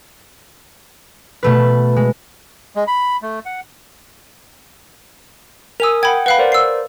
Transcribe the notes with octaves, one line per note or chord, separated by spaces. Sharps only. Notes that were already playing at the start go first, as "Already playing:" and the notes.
B2 A3 B4
G#3
G#3
B5
A3
F#5
A#4 G#5 D#6 E6 F7
F#5 G5 B5 G#6
B4 F5 F#5 B5
A#4 C5 D5
E6 C7